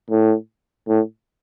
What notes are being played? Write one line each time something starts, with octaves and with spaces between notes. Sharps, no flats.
A2
A2